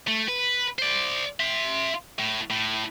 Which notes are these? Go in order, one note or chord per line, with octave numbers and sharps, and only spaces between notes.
A3
B4
C5 D5
E5 C6
A2
A2